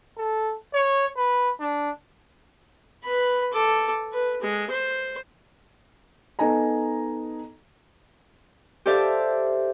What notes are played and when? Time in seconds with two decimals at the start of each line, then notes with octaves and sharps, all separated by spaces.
0.18 A4
0.74 C#5
1.17 B4
1.60 D4
3.04 B4 B5
3.53 A4 D6
4.13 B4
4.42 G#3
4.70 C5
6.39 B3 D#4 A4 D#5 G#5 A#5
8.86 G4 A4 C5 D5 E5 F5